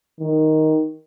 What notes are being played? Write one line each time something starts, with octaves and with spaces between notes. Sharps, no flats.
D#3